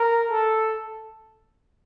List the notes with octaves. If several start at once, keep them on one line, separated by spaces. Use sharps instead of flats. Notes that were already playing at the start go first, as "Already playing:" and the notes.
Already playing: A#4
A4